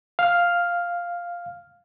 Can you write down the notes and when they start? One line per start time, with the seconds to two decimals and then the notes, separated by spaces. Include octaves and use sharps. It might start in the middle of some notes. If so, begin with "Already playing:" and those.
0.19 F5 F6